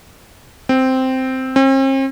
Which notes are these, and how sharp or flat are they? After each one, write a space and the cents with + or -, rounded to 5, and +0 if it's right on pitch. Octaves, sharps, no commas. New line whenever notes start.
C4 -5
C4 +45